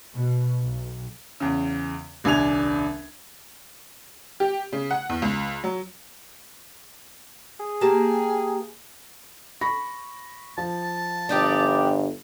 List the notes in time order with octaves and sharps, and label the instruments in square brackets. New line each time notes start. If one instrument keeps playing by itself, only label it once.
[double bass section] B2
B1
[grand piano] E2 C#3
D#1 C2 D4 G#5 G#6 F7
[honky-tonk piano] G4
C#3
F#5
E2
C#2
F#3
[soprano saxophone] G#4
[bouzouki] A#3 G4 A5
[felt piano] B5 C#6 A#6
[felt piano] F3 [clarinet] A5
[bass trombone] G1 [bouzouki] D4 D#4 G4